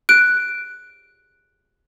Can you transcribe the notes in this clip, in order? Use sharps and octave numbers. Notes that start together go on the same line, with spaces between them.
F#6 D7